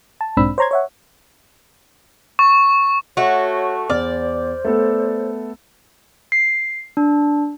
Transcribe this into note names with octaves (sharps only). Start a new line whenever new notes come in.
A5
B1 G#2 C4 D4 B5 E6
C5 C#5 A#5 C6 G#6
C#5 E5 F#5
C#6
A3 F#4 C#5
E2 C5 D5 F6
A3 B3 A4
C7
D4